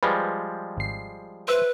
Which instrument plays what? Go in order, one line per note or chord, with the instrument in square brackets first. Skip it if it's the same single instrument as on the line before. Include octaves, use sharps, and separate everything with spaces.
[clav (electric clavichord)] F3 G3 G#3 [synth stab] B4
[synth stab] G#1 C7
[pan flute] B4 [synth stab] C5 E5